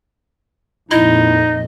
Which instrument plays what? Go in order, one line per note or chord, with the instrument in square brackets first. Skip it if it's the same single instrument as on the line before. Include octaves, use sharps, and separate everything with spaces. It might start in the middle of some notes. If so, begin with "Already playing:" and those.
[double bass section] F2 A#2 [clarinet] D#4 [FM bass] E4 [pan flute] D#5